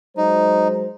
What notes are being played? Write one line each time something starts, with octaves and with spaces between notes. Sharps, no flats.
F#3 G#3 D#4 C5